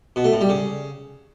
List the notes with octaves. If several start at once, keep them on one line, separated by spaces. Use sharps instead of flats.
B2
A3
A2
G3
C#3